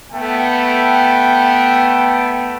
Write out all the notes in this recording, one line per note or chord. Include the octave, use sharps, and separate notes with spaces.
A3 B3 G5